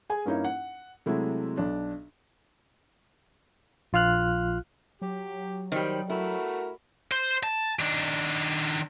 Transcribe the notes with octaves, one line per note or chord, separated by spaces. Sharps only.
G#4 G#5
G2 A#3 C#4 D#4 E4
F#5
C3 F#3 G#3 A3 E4
B1 D4
A#1 F4 F5 F6 F#6
F#3 G4
D#3 G3 C5
A3 E4 F#4 A#4
C5
A5
D#3 D4